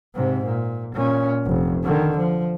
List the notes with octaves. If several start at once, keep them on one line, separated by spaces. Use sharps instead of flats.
G#2 C3
A#2
A#2 C#4
F1
D3 D#3
F3